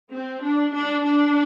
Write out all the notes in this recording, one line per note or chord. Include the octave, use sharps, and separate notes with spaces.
C4
D4
D4
D4